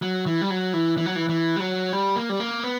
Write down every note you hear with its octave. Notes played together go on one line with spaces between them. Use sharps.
F#3
E3
G3
F#3
E3
E3
F#3
E3
E3
G3
F#3
G3
A#3
G3
A#3
B3